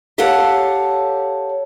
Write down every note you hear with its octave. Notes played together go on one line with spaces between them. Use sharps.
G4 A4 C#5 F5 F#5 A5